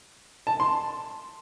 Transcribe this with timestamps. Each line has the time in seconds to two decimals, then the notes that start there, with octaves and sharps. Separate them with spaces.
0.47 A5
0.60 C6